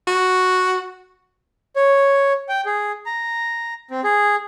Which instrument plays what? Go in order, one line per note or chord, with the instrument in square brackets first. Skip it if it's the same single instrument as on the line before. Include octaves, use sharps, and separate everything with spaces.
[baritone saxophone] F#4
[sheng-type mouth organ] C#5
G5
G#4
A#5
C4
G#4